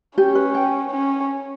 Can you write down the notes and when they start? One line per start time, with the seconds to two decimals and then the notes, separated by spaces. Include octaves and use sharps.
0.18 C#4 G4
0.35 B4
0.55 G5
0.91 C#4